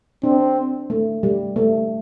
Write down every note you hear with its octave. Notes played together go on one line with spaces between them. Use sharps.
C4 D4
A3
G3
A3